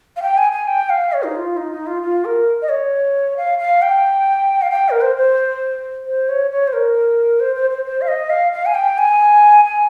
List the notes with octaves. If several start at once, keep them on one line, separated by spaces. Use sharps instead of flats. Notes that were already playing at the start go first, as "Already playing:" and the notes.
F5
G5
G#5
G#5
G5
F5
C#5
D#4
F4
D#4
D#4
F4
F4
A#4
D#5
C#5
F5
F5
G5
F5
G5
A#4
C5
C5
C5
C#5
C#5
C5
A#4
C5
C5
C5
C5
F5
D#5
F5
F5
G#5
G5
G#5
G#5